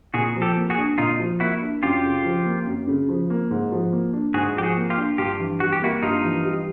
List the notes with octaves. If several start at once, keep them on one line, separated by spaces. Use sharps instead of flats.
A#2 F#4 G#4
F3
G4 A4
A#3
F#4 G#4
D4
A#2 D#4 F4
F3
A#3 E4 F#4
D4
F#2 F4 G4
C#3
F3
A#3
F#2
C#3
F3
A#3
G#2
F3
A#3
D4
G#2 F#4 G#4
F3 G4
F#4 G#4
A#3
F4 G4
D4
G2 F4 G4
E3
G3 F#4
G4
A#3 E4 F#4
G2 D#4 F4
E3
G3